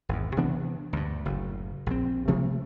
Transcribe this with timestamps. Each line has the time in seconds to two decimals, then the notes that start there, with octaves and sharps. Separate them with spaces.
0.09 G#1 E2
0.37 C3 E3 B3 D4
0.93 D2 G2
1.25 F#1 A2
1.86 A#1 C4
2.28 C3 F3 A3 A#3